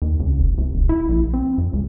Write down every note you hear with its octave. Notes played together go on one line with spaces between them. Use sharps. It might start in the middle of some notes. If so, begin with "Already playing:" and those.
D#2
C#2
F1
C2
D#1
E4
A#1
C4
F2
C#2